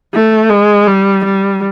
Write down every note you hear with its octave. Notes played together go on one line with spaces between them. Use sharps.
A3
G#3
G3
G3